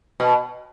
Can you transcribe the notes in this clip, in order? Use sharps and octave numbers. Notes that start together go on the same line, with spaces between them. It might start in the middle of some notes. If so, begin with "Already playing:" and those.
B2